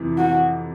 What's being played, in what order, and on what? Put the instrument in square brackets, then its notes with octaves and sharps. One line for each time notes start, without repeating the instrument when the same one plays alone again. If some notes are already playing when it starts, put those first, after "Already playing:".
Already playing: [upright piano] F2 C3 E3
[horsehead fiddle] F#4